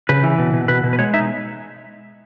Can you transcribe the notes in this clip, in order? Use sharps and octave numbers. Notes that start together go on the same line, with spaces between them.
C#3 B4
E3
B2
B2
B2 B4
B2
B4
G#3 C#5
D#4 E5